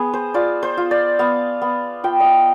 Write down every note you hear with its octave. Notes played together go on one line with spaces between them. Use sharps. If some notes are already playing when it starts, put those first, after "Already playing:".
Already playing: B3 G#4
C5
F4 D5
C5
F4
D5
B3 F5
B3
F4 G5
D#5 F5